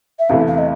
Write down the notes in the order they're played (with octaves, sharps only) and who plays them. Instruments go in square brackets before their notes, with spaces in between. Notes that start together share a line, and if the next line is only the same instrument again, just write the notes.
[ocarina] E5
[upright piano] E2 C3 E3 A3 [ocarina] F5
[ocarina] F5
D#5